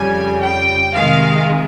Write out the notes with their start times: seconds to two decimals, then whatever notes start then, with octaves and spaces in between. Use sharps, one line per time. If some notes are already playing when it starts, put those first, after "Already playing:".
Already playing: F2 C#3 G3 G#5
0.42 G5
0.93 C3 D#3 G#3 F5